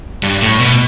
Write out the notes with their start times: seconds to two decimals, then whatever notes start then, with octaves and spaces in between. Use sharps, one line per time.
0.23 G2
0.42 A2
0.60 B2